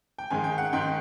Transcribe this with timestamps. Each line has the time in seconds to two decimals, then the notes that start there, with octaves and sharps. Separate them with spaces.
0.18 G5
0.30 G#2 D#3 G#3 G#5
0.44 G5
0.58 F#5
0.73 G#2 D#3 G#3 G5